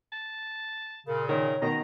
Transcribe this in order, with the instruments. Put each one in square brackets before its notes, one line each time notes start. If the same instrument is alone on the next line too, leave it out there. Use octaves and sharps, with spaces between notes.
[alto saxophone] A5
[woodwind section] A#2 C#3 [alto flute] A#4
[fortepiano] D#3 [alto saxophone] A#4 [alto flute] C#5
[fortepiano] B2 D#3 [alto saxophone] D#5 [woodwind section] A#5